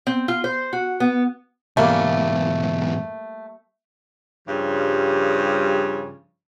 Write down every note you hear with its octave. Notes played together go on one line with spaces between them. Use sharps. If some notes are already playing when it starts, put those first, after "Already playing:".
C4
F4
C5
F#4
B3
E2 G#2 G3 A3 A#3
G2 C#3 F3 G3